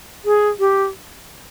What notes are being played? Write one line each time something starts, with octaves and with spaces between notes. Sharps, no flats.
G#4
G4